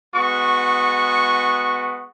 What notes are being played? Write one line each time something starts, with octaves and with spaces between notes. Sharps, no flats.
G#3 B3 F#4 C#6